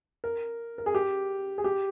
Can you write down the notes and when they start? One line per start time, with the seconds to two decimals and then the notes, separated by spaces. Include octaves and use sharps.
0.24 A#4
0.78 A#4
0.86 G#4
0.95 G4
1.58 G#4
1.64 G4